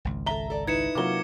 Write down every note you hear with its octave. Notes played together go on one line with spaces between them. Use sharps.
G#1 C#2
A4 E5 A#5 G7
A4 D5
D#4 E4 B4 G#6 C#7 E7
C3 F#3 A#3 F4 D6 G7